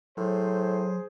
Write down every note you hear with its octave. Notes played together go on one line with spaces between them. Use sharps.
A2 F#3 G#4 C5